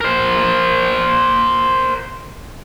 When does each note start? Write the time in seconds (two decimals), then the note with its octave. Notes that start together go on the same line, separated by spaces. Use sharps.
0.01 A#4 C5